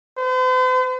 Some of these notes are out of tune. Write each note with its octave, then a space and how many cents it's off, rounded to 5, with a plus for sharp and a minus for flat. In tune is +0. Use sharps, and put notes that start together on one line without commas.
C5 -45